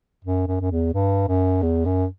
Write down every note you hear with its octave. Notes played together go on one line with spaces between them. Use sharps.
F#2
F#2
F#2
E2
G2
F#2
E2
F#2